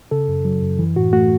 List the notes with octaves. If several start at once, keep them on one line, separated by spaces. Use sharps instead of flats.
C#3 A4
F#2
F#3
F#2
E3
A2 F#4
A3 F#4